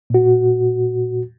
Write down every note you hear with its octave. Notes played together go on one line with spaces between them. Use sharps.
A#2 F#4